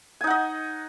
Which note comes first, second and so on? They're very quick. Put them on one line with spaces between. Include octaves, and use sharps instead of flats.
G#5 D#4 F#5 D#5